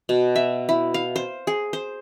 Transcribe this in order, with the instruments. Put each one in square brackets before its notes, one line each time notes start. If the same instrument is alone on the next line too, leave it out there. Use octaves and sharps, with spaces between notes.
[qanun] B2
E5
E4
F5
C5
G#4
C5